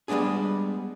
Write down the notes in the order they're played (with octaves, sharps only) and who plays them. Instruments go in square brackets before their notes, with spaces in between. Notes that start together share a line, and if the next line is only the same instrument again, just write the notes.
[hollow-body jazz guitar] G3 G#3 B3 D4 G#4